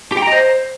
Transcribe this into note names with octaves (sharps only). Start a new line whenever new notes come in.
G4
G5
A#5
D#5
C5